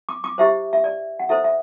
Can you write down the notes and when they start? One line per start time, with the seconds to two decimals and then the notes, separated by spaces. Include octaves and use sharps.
0.09 D6
0.24 D6
0.38 E4 G4 C5 E5
0.73 E5
0.84 D5
1.19 F#5
1.29 E4 A4 C5 E5
1.44 E5